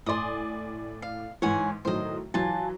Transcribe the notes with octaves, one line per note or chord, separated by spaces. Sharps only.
A2 D5 G#5 C6 D#6
F5
G#2 E3 C#5 F#5 G#5
A2 D#3 F#3 C5 D#5
E3 F#3 F4 G#5 A5